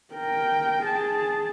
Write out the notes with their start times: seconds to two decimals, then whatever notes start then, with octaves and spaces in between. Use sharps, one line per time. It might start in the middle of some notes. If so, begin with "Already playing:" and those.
0.14 A#4 G5
0.83 G#4 A5